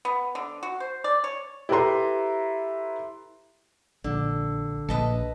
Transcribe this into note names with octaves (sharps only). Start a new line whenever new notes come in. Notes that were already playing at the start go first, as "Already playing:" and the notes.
B3
D3
F#4
C5
D5
C#5
E4 G4 A4 B4 A#5 C6
A#1 D3
A#1 B4 D#5 A5